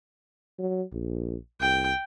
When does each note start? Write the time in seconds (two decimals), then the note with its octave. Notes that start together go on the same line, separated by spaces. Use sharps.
0.59 F#3
0.92 A#1
1.60 C2 G5